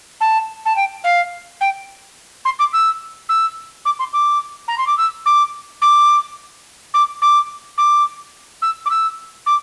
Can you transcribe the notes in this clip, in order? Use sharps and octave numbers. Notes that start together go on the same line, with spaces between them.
A5
A5
G5
F5
G5
C6
D6
E6
E6
D6
C6
D6
A#5
C6
D6
E6
D6
D6
D6
D6
D6
E6
D6
E6
D6